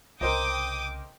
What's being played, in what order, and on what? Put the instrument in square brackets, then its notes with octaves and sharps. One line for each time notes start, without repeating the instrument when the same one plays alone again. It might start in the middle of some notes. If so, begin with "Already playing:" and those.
[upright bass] C2 C#3 [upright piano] A#4 C5 D#5 [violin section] G5 D6 D#6